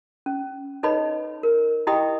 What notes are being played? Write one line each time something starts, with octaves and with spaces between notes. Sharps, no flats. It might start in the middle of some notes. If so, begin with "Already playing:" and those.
C#4
D#4 A4 B4 C#5 D#5 B5
A#4
E4 G4 D#5 G5 B5 D#6